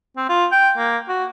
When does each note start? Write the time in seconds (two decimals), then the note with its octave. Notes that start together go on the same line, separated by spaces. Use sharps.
0.16 C4
0.29 F4
0.51 G5
0.77 A#3
1.08 F#4